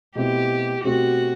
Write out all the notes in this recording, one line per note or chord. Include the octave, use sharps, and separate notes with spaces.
B2 A3 C4 E4 G4
B2 A3 C4 F#4 G4